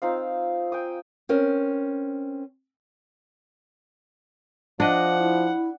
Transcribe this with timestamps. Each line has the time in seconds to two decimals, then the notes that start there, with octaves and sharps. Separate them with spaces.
0.02 C4 D#4 F4 F5
0.72 G5 G#5 D#6
1.29 C4 C#4 A#4 C5
4.80 F3 D4 D#5 F#5
5.19 E4